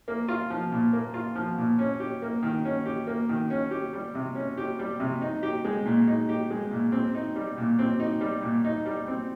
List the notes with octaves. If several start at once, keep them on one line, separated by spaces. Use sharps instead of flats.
A#3
F4
F3
A#2
A#3
F4
F3
A#2
C#4
G4
A#3
D#3
C#4
G4
A#3
D#3
C#4
G4
G3
C3
C#4
G4
G3
C3
D#4
G4
G#3
A#2
D#4
G4
G#3
A#2
C4
D#4
G3
A#2
C4
D#4
G3
A#2
D#4
G3
C4